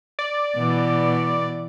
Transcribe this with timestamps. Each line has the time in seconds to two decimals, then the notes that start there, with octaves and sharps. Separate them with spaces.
0.19 D5
0.57 B2 E3